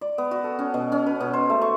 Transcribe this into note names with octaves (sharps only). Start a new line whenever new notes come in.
D5
B3
F#4
A4
C#4
B2
C#4
B4
B2
C5
A3
C#6